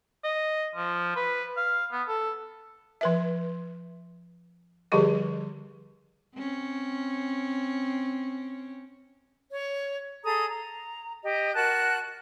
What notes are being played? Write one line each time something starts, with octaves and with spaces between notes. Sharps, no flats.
D#5
F3
B4
F5
B3
A4
F3 B4 E5
D3 F3 G3 G4 G#4 D#5
C4 C#4
C#5
G#4 A4 A#5 D#6
A#5
G4 D#5
F#4 A#4 A5 F#6